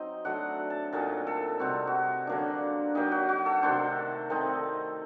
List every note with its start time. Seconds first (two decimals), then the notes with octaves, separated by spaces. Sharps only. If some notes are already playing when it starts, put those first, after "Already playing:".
Already playing: F#3 C4 D#4 D#5
0.25 F#3 A3 D4 F#5
0.70 A5
0.93 A#2 F#3 A3 D#4 A#4
1.27 A4
1.59 C3 G3 C4 F#4
1.87 F#4
2.27 D3 F#3 A#3 D4
2.95 F#3 A#3 D#4 G4
3.12 F#4
3.29 F#4
3.46 A4
3.62 C3 D#3 A3 D4 C5
4.30 D#3 A3 C4 D#4